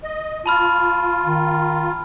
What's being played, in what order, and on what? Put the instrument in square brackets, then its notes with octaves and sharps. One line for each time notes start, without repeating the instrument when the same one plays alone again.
[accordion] D#5
[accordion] F4 [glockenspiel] A5 B5 F6
[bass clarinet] D#3